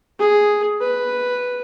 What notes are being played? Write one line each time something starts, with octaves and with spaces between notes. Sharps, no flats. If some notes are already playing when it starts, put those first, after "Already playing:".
G#4
B4